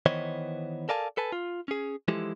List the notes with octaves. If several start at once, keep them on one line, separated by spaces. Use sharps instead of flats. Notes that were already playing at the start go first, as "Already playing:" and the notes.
D#3 E3 B3 C5 C#5 D#5
A4 A#4 D5 F5 G#5 A5
A4 B4 G#5 A5
F4
C#4 G#4
E3 F3 G#3 E4 G4 A4